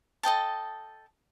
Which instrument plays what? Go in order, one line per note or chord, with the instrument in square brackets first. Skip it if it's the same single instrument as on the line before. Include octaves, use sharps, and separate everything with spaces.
[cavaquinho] A4 D#5 G5 A5